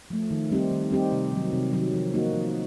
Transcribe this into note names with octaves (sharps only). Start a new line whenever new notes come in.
F3 A3
D#3
G3 C4 D#4 G4
D#3
G3 C4 D#4 G4
C3
D#3 F#3
C3
D#3 F#3
F3
A#3 D#4 F#4
F3